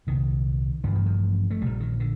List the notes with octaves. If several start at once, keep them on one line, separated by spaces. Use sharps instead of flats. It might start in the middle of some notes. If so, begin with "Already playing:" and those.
C2 A#2 D#3
A1 G2 D3 F3
D#3
F3
A3
A#1 A#2 G3
D#3
D3